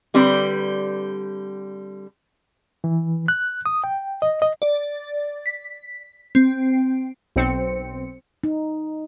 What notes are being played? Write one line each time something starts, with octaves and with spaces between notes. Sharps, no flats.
D3 G3 C4 B4 D5
E3
F#6
D#6
G5
D#5
D#5
D5
B6
C4
B1 C4 C#7
D#4